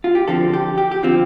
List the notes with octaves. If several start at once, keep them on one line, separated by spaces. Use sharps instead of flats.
F4
G4
D3 F3 C4 A4
G4
G4
G4
D3 F3 C4 F4